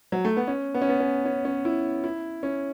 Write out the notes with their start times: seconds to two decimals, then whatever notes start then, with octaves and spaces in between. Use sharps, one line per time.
0.12 F#3
0.25 A3
0.37 B3
0.48 C#4
0.74 B3
0.82 C#4
0.89 B3
1.00 C#4
1.25 C#4
1.45 C#4
1.65 E4
2.04 E4
2.43 C#4